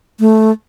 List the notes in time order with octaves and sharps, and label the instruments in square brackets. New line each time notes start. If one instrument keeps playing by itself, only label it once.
[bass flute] A3